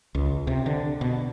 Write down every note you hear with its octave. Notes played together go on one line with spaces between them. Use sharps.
C#2
C3
D3
B2